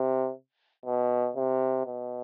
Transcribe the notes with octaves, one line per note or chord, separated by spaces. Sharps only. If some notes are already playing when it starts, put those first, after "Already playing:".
Already playing: C3
B2
C3
B2